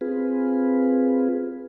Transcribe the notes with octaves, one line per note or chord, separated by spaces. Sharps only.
C4 F4 G#4 B4